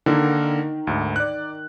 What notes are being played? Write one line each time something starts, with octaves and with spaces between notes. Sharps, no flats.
D3 D#3 A#3 A#4
D2 G#2
D5 F#6